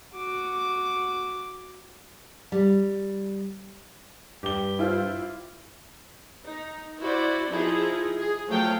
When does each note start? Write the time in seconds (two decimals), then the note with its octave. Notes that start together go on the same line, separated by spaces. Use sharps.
0.13 F#4 D6
2.52 G3
4.43 G2 G4 G7
4.79 E4 F4 C5
6.44 D#4
7.00 E4 F#4 C5 D5
7.49 F3 D#4 E4 G#4
8.17 G#4
8.48 F3 F#3 A3 F5 G5